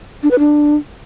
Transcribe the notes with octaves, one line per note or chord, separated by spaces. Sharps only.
D4
B4
D4